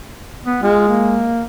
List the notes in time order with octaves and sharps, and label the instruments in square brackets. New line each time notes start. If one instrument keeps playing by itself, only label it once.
[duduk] B3
[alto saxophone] G#3 [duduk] F4
[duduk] A#3